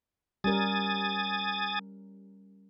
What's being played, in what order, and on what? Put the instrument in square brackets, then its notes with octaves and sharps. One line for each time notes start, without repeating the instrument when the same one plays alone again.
[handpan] G3 C#4 A#4 [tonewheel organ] G#5 D#6 A6